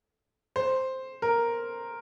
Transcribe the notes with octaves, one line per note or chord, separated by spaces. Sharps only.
C5
A#4